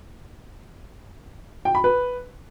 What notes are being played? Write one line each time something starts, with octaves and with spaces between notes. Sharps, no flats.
G5
B5
B4